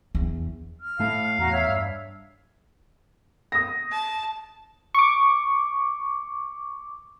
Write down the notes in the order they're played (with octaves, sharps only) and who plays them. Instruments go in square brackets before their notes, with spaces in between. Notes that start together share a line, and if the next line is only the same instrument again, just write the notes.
[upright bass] E2
[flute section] F6
[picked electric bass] A2 A3 [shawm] F5
[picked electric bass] E2 [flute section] F#4 A#5 F6
[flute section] C#5 E5 E6
[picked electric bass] G2
[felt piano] D#6 A#6
[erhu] A5
[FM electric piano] C#6 D6